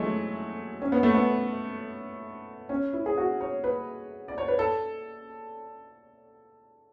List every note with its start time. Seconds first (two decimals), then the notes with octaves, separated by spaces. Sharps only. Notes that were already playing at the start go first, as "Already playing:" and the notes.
Already playing: E3 F#3 G#3 A3
0.82 C#4
0.92 B3
1.03 A3
1.14 B3
2.69 C#4
2.93 E4
3.06 G#4
3.18 F#4
3.41 C#5
3.64 B4
4.28 D5
4.38 C#5
4.48 B4
4.59 A4